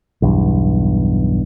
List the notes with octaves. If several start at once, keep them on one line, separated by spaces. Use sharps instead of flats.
B1 E2 G2